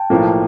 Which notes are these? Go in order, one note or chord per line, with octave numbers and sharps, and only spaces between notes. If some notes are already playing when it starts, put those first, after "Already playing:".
Already playing: G5 A5
B1 A2 F3 A#3